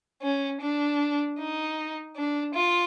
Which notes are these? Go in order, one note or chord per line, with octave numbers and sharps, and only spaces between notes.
C#4
D4
D#4
D4
F4